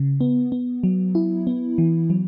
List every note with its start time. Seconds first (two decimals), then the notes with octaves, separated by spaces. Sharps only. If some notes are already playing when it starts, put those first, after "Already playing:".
Already playing: C#3
0.21 B3
0.52 B3
0.83 F#3
1.15 E4
1.47 B3
1.78 E3
2.10 F#3